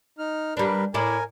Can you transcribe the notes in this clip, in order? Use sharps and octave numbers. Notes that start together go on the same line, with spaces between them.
D#4 F6
G3 D4 A#4 B4
A2 E4 A#4 D5 G#5